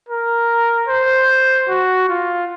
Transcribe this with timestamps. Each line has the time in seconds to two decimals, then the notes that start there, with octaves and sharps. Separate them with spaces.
0.09 A#4
0.88 C5
1.69 F#4
2.09 F4